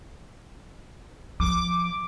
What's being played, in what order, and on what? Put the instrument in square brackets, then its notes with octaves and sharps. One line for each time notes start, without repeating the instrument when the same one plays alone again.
[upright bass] F3 [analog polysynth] D6